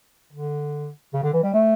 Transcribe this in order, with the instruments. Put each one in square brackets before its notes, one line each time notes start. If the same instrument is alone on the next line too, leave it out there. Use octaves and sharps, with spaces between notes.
[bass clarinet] D3
C#3
D3
E3
G3
A3